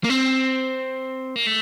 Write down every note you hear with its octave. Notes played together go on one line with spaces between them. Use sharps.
A#3
C4
A#3
A3